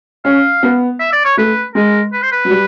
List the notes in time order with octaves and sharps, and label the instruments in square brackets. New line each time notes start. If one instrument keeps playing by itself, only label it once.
[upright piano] C#4 [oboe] F5
[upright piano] B3
[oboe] E5
D5
C#5
[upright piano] A3 [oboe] B4
[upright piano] G#3 [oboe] A#4
[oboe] B4
C5
B4
[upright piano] F#3
G3